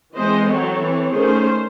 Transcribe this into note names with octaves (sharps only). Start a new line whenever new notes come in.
E3 G#3 C4 C5 D#5
F#3 C4 A4 C#5
E3 C4
D#3 A3 C#4 G#4 C5